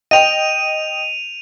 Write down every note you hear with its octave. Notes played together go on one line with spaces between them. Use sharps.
D#5 G5 D#7 F7